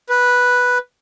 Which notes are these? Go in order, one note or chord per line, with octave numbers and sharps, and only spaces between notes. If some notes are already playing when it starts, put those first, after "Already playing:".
B4